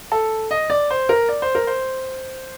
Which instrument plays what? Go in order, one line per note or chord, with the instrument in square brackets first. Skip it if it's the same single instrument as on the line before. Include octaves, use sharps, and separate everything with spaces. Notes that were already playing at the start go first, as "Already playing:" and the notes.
[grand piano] A4
D#5
D5
C5
A#4
D5
C5
A#4
C5